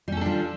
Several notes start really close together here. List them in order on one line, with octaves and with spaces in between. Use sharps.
G3 C#4 A4 D4 F3